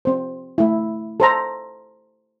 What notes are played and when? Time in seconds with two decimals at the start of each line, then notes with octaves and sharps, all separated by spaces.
0.05 C4 C5
0.58 A3 E4
1.20 A4 C5 A#5